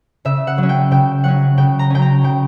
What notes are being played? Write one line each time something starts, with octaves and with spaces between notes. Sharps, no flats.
C#3 E5
F#5
F#3
C#4
G5
C#3 G5
F#3 C#4 F#5
C#3 G5
A#5
F#3 C#4 G5
A#5
C#3 G5